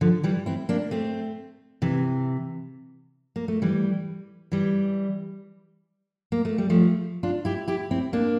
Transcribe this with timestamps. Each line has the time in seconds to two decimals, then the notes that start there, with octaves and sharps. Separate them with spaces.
0.01 D3 F3
0.24 E3 G3
0.46 C4 E4
0.69 A#3 D4
0.91 A3 C4
1.82 C3 E3
3.36 A#3
3.48 A3
3.62 E3 G3
4.52 E3 G3
6.32 A#3
6.45 A3
6.58 G3
6.70 F3 A3
7.23 D4 F4
7.45 E4 G4
7.68 E4 G4
7.91 C4 E4
8.13 A#3 D4